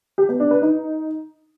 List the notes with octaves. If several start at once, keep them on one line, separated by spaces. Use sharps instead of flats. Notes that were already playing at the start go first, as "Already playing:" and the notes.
G4
B3
D4
B4
D#4